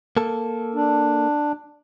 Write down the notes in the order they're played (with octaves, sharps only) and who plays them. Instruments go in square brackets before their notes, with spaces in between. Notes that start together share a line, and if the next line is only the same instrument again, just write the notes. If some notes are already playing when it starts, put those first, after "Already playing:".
[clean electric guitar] A#3 A4
[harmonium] D4